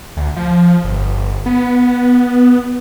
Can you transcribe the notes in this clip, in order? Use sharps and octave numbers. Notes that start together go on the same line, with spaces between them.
D2
F3
G1
B3